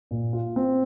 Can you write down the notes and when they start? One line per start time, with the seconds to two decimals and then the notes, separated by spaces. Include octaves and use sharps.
0.11 A#2
0.33 F4
0.56 C4